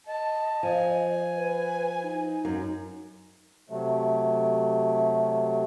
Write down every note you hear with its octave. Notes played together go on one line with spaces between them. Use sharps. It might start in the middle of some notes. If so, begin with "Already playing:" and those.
D#5 A5
F3 G#5
B4
D#4
F#2
C3 F#3 A3